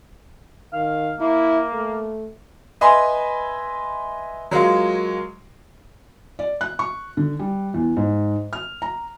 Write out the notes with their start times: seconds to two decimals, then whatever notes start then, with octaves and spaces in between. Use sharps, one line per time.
0.73 D#3 F5
1.20 A#3 E4
1.73 A3
2.81 B4 D#5 E5 G#5 B5 C6
4.51 F#3 G#3 A#3 F4
6.39 D5
6.61 F#6
6.79 C#6
7.17 D3
7.39 G3
7.74 E2
7.97 G#2
8.53 F6
8.82 A#5